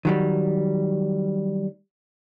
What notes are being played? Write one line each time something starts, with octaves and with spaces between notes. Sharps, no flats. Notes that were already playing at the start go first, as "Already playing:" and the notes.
D#3 F#3 G3